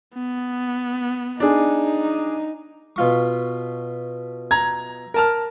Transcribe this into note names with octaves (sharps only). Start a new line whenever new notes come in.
B3
D4 D#4 G#4
B2 F4 C#6
A#5 G#6
A#4 A5 F6